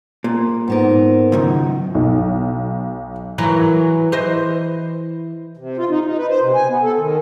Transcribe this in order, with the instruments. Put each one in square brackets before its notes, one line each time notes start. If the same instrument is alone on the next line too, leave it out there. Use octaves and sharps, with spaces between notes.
[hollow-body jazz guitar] A#2
[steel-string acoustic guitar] G#2 B3 A#4
[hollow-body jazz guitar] C#2 F#2 D#3
[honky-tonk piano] B1
[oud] E3 F#3 A#4
E3 C5 D#5
[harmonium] C3
F4
D#4
D#4
B4
C5
C3
G#5
B3
A4
D#3